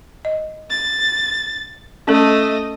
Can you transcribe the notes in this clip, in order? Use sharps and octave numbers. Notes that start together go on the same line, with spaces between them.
D#5
A6
A3 C#4 A4 D#5 A5